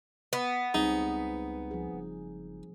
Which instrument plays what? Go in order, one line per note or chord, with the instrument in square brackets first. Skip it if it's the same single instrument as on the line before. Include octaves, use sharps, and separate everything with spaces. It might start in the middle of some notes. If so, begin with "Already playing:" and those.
[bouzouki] B3
[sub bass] C#2 [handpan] G3 C4 G#4 [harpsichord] D#4
[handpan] F3 G#4
[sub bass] F#1